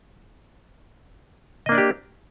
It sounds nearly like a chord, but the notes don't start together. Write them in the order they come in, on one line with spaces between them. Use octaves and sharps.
D#5 A#3 D4 D5 G4